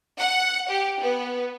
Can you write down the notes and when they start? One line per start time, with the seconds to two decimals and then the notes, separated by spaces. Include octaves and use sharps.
0.19 F#5
0.70 G4
1.01 B3